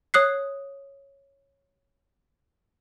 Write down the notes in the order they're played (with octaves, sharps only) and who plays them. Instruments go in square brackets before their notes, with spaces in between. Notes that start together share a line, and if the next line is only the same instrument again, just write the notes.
[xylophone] C#5 D#6 F#6 C7